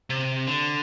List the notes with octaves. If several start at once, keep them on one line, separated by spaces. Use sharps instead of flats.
C3
D3